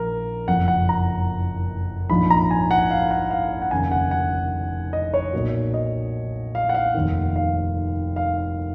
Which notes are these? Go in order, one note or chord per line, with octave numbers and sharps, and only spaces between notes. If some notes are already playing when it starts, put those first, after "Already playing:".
Already playing: A#1 A#2 F3 A#4
F#1 F2 F3 F#5
F#5
A#5
A#1 G#2 F3 B5
A#5
G#5
F#5
F5
F#5
F5
F#5
F1 D#2 C#3 G#5
F#5
F#5
D#5
C#5
B1 A#2 F#3
D#5
F5
F#5
F5
F1 D#2 D#3
F5
F5